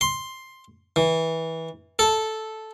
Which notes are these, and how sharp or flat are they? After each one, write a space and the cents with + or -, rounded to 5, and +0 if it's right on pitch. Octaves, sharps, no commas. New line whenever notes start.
C6 +5
E3 -20
A4 -5